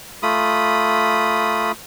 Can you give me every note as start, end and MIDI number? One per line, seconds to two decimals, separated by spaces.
0.23 1.72 57
0.23 1.72 65
0.23 1.72 83
0.23 1.72 87